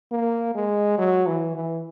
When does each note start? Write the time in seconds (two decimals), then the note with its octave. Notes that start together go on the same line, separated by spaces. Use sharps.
0.11 A#3
0.55 G#3
0.98 F#3
1.27 E3
1.56 E3